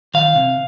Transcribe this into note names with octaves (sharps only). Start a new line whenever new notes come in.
D#3 F5
C3